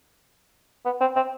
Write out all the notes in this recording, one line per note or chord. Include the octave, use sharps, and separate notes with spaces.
B3
C4
C4